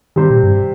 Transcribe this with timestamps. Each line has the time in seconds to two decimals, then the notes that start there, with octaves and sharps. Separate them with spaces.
0.16 C3 D#3 G3 C4 G4 C5
0.30 A#2
0.43 G2